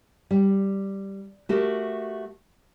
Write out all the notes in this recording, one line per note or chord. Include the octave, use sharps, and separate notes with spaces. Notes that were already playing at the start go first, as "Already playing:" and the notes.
G3
A3 F#4 G4 A#4